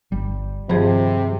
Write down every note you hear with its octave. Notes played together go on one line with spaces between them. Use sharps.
G1 G3
G2 C3 D#3 F3 G#4